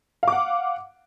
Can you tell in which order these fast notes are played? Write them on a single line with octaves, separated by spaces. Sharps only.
F5 D6 F#5